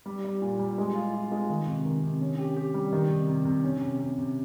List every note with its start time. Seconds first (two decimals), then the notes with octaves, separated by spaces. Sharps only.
0.06 G3
0.25 G3
0.42 A#2
0.59 G3
0.78 G#3
0.95 F4
1.14 F4
1.32 G#3
1.50 D#3
1.67 C3
1.85 D#3
2.03 C3
2.21 C#4
2.38 G4
2.56 G4
2.74 G3
2.92 D#3
3.10 C3
3.28 C3
3.45 C3
3.64 C#4
3.81 C3
3.99 C3
4.18 C3